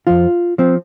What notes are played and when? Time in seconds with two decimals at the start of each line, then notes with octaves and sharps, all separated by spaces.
0.07 F2 F3 F4
0.58 F3 C4